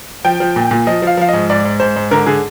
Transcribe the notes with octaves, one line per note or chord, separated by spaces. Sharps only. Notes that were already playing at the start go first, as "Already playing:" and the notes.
F3 G5
F3
A#2
A#2
F3 D#5
F3
F5
F3 F5
G#2 D#5
G#2 D5
G#2
G#2 C5
G#2
D3 A#4
D3 G#4